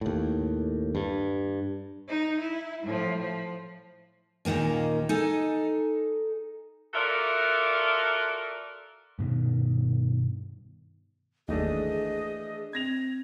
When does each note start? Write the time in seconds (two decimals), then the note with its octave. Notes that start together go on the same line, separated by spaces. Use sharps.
0.01 D#2 A2
0.95 G2
2.08 D#4
2.40 E4
2.84 A2 F3
3.21 F3
4.45 D#2 A#2 D#3 A#3 C#4
5.09 D#4 A4 G#5
6.94 F4 F#4 A4 A#4 D5 E5
9.19 G2 B2 D#3
11.48 G1 D#2 E3 A3 D4 G#4 D#5
12.73 C4 G#6 A#6 F7